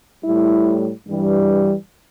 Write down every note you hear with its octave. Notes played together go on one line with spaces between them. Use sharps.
A2 G3 E4
G2 E3 G3